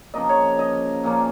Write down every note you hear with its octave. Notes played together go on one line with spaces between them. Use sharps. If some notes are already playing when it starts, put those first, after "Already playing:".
C#3 F3 A#3 D#5
C#5
D#5
A#2 F3 A#3 C#4